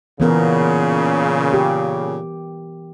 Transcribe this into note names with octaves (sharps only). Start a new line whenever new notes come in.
A#2 C#3 E3 B3 A#4
G4